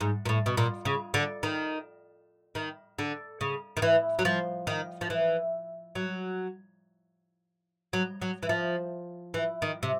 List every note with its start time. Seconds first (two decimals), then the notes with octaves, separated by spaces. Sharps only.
0.01 G#2
0.26 A#2
0.29 A2
0.46 B2
0.57 A#2
0.85 C#3
1.14 D3
1.43 D#3
2.55 D#3
2.99 D3
3.41 C#3
3.77 D#3
3.82 E3
4.19 F#3
4.25 F3
4.67 D#3
5.01 F3
5.10 E3
5.95 F#3
7.93 F#3
8.22 F#3
8.43 E3
8.49 F3
9.34 E3
9.62 D#3
9.83 C3